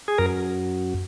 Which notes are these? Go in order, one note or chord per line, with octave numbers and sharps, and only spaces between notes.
G#4
F#2 A#4